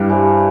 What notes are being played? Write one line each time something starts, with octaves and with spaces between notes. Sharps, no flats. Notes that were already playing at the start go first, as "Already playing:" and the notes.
Already playing: G2 G3 E4
G4 C5 E5 G#5